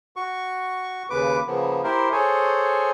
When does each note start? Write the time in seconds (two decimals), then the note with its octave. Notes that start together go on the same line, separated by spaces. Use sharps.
0.16 F#4 C#6
1.10 D#2 C#3 B4 D6
1.47 C#3 F3 A#3 B3
1.84 E4 G4 A#4 C5
2.12 G#4 A4 C5 C#5 G#5